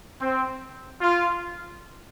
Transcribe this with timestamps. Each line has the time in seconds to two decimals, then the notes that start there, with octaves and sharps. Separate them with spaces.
0.19 C4
1.00 F4